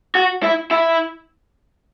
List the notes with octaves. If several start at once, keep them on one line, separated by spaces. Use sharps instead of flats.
F#4
E4
E4